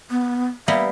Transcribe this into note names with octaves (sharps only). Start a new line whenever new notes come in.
B3
G3 A#3 B3 E5